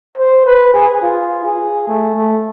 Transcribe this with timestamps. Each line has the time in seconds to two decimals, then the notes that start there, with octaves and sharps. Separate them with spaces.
0.17 C5
0.46 B4
0.74 G#4
1.02 F4
1.45 G#4
1.88 A3
2.16 A3